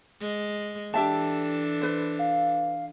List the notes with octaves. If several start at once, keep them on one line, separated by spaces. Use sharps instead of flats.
G#3
E3 D4 G4 A4 E5 A5
B4 C5
F5